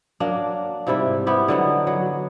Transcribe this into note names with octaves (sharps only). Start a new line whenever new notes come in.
F#3 A#3 D4
G#2 C3 G3 E4
B3 E4 G4
D3 F#3 B3 D#4
F#3